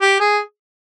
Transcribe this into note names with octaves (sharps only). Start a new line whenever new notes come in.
G4
G#4